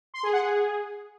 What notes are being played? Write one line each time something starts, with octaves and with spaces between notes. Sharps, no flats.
C6
G#4
F#5
G#4